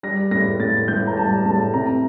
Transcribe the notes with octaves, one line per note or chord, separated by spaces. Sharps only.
G3 A#6
A2 A#6
A2 A6
A2 G6
A#5
G3 A5
A2 A5
C3 A#5